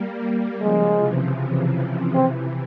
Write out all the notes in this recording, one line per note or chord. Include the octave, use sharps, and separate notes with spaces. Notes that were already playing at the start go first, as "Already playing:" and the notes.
Already playing: G3 A#3
C#3 F3 G#3
C3 E3
C3 E3 C4